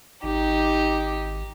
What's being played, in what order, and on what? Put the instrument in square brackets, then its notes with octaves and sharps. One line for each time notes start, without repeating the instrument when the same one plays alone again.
[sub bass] G#1 [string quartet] D#4 G4